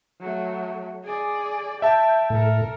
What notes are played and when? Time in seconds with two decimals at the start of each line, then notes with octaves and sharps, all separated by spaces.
0.20 F#3 A3
1.04 G#4 D5
1.82 E5 G5 A5
2.30 A2 A4 A#4